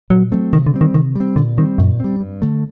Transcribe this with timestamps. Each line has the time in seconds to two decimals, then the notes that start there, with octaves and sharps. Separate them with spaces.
0.10 A#2 F#3
0.32 F#3 A3 C4
0.52 C3 D#3
0.67 D3
0.74 G3 C4
0.81 D#3
0.94 C3 D#3
1.15 G3 C4
1.36 A#2 D3
1.57 D#3 G3 C4
1.78 F#2 A#2
2.00 G3 C4
2.21 G2
2.42 D3 A3